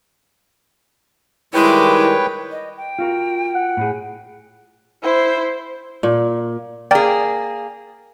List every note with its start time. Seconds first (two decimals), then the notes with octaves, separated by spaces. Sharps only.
1.54 D#3 G3 G#3 E4 B4 C#5 G5 D6
2.51 D#5
2.77 G5
2.99 F4 F#4 A#4
3.55 F#5
3.77 A2 G#4
5.03 E4 C5
6.03 A#2
6.91 A#3 G#4 D5 G5